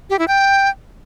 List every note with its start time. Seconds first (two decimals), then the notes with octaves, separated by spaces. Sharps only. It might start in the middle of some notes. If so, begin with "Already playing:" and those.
0.10 G4
0.19 E4
0.28 G5